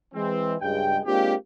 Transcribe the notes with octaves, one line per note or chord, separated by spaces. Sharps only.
E3 G#3 C4
C#2 G2 G#3 G5
G#3 A#3 C4 D4 F4 G4